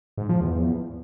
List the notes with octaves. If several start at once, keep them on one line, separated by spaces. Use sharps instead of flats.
G#2
F3
E2